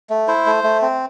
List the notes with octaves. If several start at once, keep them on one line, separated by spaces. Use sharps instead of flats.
A3
E4 C5
A3
A3
C4